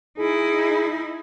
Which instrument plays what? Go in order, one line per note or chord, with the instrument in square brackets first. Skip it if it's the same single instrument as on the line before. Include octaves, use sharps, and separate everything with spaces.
[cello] D#4 E4 [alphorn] G#4